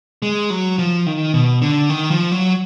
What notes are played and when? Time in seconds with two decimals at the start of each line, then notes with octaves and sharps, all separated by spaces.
0.22 G#3
0.50 F#3
0.78 F3
1.06 D#3
1.34 B2
1.62 D3
1.90 D#3
2.11 F3
2.32 F#3